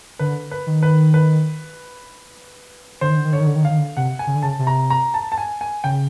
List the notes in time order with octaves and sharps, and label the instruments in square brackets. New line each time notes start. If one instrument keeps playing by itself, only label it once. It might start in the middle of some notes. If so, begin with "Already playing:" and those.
[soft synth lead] D3 [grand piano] B4
[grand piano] B4
[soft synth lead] D#3
[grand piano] B4
B4
[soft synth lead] D3 [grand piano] C5
[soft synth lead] D#3
D3
D#3
[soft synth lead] D3 [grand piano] C#5
[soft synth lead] D#3
D3
D#3
[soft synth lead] D3 [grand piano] F5
[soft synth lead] D#3
D3
[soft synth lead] C3 [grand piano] F#5
[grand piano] G#5
[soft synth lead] C#3
D3
[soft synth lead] C#3 [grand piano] A5
[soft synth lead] C3
[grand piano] A#5
A#5
A5
A5
G#5
G#5
[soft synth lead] C#3 [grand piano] G5